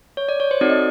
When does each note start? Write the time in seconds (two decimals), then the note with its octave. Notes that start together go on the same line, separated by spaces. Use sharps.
0.17 C#5
0.29 D5
0.40 C#5
0.51 C5
0.61 C4 D#4 F#4 A4 D5
0.70 D#5